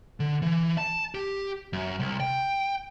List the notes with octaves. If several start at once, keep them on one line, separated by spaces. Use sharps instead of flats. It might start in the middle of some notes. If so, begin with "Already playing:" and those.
D3
E3
A5
G4
F#2
C2
G5